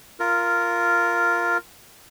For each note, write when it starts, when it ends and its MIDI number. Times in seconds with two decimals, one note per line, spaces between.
0.20 1.57 65
0.20 1.57 70